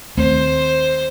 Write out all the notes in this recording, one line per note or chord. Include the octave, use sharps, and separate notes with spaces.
D#2 A3 C4 C5